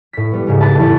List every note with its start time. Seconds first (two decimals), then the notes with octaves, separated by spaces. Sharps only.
0.13 A2 B6
0.31 G3 B3
0.47 G#2 C#3 G3
0.60 E5 A5 B5 D#6 G6 A6
0.75 E1 A2 E3 F#3 E4 E6